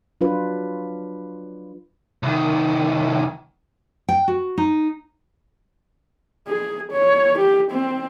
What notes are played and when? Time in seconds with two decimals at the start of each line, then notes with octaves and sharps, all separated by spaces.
0.21 F#3 D4 F4 B4
2.23 C2 D#3
4.09 G5
4.28 F#4
4.58 D#4
6.48 G#4
6.92 C#5
7.39 G4
7.71 C4